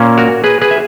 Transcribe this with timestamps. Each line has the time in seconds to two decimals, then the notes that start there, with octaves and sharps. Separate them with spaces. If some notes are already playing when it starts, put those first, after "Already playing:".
Already playing: A#2 A#3 C#4
0.18 F#4 A#4
0.44 G#4 B4
0.62 G#4 B4
0.71 E5